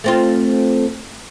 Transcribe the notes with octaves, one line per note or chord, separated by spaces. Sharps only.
A3 C4 F4